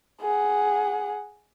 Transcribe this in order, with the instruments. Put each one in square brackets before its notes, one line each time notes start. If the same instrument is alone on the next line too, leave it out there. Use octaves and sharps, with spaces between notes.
[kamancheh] G#4 F#5